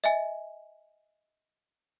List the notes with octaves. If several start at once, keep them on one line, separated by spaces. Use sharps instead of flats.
D#5 E5 G#5